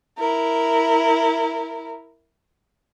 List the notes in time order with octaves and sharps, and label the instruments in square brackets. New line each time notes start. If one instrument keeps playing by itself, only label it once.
[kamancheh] E4 A#4